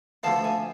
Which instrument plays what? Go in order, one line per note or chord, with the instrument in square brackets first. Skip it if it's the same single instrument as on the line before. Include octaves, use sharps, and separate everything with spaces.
[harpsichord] D2 D3 F3 B3 [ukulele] F5 A5
[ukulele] E5 G#5